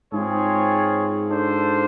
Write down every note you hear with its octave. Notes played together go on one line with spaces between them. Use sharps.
G#2 C4 F4 G#4 C#5
D4 F4 A4 C5